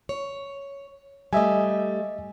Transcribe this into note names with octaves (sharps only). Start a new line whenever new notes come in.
C#5
G3 A3 D#5 E5 G#5